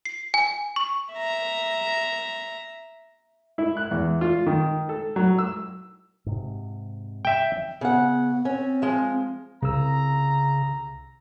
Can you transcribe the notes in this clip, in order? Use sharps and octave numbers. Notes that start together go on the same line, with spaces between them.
C7
G#5
C#6
E5 A#5
E4
F#6
E2
F4
D#3
A4
F#3
E6
G#2 C3
E5 G5
C#3 B3 F#5
C4 C#4
F3 G#3
C2 C#3 A#5 E6